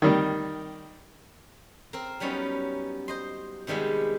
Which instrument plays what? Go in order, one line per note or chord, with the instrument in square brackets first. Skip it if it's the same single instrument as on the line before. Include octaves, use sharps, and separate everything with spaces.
[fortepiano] D#3 G3
[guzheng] C4 A#4
F#3 G3 B3 C#4 D#4
C5 D#5 C6
C3 D#3 G3 G#3 B3